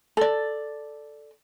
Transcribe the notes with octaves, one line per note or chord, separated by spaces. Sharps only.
A4 D5